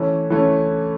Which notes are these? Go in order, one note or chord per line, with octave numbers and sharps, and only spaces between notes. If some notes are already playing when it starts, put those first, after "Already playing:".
Already playing: E3 A3 C#4
E3 A3 C#4